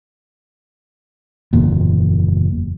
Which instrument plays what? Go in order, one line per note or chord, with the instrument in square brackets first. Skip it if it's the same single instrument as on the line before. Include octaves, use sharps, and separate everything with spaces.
[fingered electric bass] F#1 E2 A#2